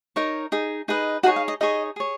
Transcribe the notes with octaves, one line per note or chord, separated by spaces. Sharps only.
D#4 A#4 C#5
D#4 G#4
D#4 G#4 B4 D#5
D#4 F#4 G#4 C#5 F#5
F5
D#5
D#4 G#4 C#5 D#5
G#4 C#5